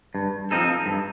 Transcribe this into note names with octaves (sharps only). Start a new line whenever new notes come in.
G2
F3 C4 D#4 A4
G2